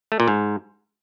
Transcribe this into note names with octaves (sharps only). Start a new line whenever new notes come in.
A3
A#2
G#2